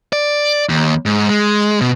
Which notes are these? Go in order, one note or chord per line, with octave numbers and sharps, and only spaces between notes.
D5
D#2
G#2
G#3
B2